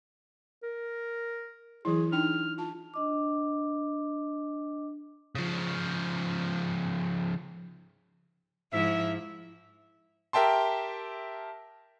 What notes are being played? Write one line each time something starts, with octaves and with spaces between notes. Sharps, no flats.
A#4
E3 F#3 E4 G#4
D4 D#4 G5 F6
F4 A5
D4 D#5 D6
C#3 F3
G#2 F3 E4 E5
G4 A#4 E5 G5 A5 C6